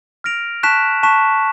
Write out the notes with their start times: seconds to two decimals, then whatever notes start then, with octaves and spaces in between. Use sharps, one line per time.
0.24 F6 A#6 D7 F7
0.63 A5 C#6 F#6 B6 E7
1.03 A5 C#6 F#6 B6 E7